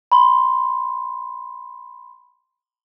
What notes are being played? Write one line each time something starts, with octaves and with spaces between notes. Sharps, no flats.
B5 C6